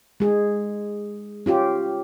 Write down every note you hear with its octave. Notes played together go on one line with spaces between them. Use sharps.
G#3 G#4
C#4 F4 G4